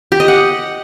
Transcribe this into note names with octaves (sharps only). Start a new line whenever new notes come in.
G4
D#5
F#5